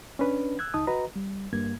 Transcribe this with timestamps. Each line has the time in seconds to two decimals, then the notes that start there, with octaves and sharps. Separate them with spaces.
0.19 C#4 D4 B4
0.59 E6 F#6 G#6
0.74 C#2 D#4 A5 D#6
0.87 F#4 B4 D#5 A#5
1.16 G3
1.53 G2 A#3 G#6